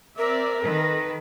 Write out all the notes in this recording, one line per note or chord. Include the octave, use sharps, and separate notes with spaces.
C4 A#4 D5 E5
D#3 A4 B4